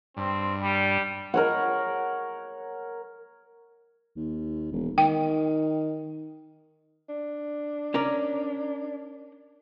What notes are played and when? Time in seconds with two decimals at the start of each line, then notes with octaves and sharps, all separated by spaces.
0.17 G2 C4
0.62 G3
1.34 A#4 C#5 F#5
4.16 D#2
4.72 E1
4.98 D#3 G5
7.09 D4
7.94 C#4 A#4 D5